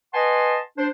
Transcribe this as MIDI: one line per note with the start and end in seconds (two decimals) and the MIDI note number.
0.14 0.58 71
0.14 0.58 75
0.14 0.58 78
0.14 0.58 80
0.14 0.58 81
0.14 0.58 84
0.78 0.87 62
0.78 0.87 72